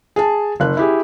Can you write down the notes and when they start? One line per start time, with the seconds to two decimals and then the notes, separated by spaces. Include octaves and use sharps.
0.16 G#4 A5
0.60 F#1 F#6
0.77 E4 G4 G#4